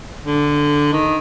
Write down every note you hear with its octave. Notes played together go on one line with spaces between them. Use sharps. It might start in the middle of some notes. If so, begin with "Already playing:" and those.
D3
D#3